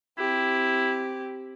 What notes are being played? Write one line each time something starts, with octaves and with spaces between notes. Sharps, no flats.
C4 E4 G4